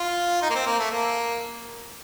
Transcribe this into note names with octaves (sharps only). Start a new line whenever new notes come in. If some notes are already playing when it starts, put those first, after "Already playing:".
Already playing: F4
D#4
A#3
C4
A#3
A3
A#3